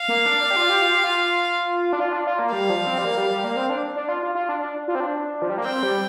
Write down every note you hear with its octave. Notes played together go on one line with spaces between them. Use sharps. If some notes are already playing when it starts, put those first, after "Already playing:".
Already playing: F5
A#3
D4
D4
G4
F4
G4
F4
G4
F4
D4
F4
D4
F4
A#3
G3 F5
F3
C4
G3
A#3
G3
G3
A#3
C4
D4
D4
F4
F4
F4
D4
D4
F4
C4
D4
F3
G3
A#3
C4 G5
G3